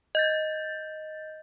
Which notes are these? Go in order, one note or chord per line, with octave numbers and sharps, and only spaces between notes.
D#5 G6 A6